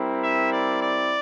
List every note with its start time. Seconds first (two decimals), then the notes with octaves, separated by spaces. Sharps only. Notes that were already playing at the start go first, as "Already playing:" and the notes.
Already playing: G3 C4 E4 A#4
0.24 E5
0.52 D5
0.82 D5